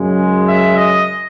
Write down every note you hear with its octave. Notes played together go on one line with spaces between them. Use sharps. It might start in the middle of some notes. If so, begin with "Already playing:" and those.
Already playing: F#2 C#3 G#3
E5
D#5